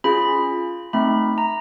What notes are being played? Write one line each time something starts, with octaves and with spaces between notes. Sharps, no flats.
C#4 F4 G#4 B5
A3 C4 D#4 B5
A#5